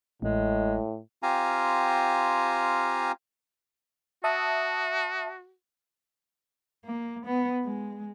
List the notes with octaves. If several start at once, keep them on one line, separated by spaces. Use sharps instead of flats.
A1 A2 G#3
C4 F4 G4 F5 G#5 A#5
F#4 E5 A5 D#6
A#3
B3
G#3